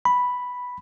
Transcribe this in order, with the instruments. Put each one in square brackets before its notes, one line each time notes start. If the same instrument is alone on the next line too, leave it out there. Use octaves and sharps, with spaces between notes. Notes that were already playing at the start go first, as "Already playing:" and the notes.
[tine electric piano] B5